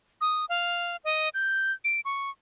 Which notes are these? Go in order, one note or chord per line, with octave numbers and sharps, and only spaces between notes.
D#6
F5
D#5
G6
D7
C#6